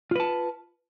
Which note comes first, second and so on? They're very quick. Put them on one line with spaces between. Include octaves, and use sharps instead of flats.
F4 B4 A5